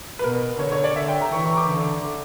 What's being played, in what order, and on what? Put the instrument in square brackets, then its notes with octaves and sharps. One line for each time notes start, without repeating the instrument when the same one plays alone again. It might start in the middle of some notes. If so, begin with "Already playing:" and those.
[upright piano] B4
[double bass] B2 [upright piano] A#4
[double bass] D3 [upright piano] C#5
[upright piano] C#5
D5
[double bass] D3 [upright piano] E5
[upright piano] G5
A#5
[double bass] E3 [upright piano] C#6
[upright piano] C#6
D6
[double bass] D3